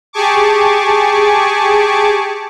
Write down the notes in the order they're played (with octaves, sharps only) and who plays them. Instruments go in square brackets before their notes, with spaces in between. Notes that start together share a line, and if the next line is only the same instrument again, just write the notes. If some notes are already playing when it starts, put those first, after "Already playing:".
[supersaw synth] G4 G#4 G#5 A5 C#6 D6